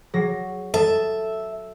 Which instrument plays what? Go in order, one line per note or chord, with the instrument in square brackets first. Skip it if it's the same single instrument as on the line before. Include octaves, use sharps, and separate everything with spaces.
[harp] F#3 A#6 [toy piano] G#4 F#5
[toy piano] A4 [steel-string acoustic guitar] E5 [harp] A5